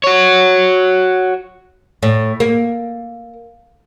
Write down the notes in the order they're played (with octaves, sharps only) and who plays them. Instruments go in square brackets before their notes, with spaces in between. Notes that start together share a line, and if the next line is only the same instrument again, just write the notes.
[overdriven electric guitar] F#4 C#5
[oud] A2
A#3